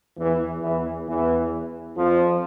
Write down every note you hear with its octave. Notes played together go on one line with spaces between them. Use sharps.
E2 E3
E2 E3
E2 E3
F2 F3